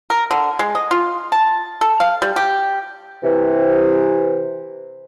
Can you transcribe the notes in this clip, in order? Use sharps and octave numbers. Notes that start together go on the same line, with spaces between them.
A#4
D3
G#3
D#5
F4
A5
A4
F5
G3
G4
C3 E3